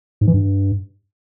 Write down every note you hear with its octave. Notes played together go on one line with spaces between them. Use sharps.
G#2
E3
G2